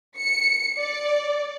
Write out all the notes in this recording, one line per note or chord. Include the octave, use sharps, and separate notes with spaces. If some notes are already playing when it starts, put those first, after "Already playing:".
C#7
D5